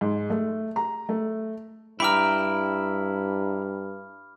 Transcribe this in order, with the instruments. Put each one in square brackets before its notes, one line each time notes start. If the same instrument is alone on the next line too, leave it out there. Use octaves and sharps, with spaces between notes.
[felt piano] G#2
A3
A#5
A3
[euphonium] G2 [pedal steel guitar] E4 G5 A#5 [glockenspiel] B5 D6 F6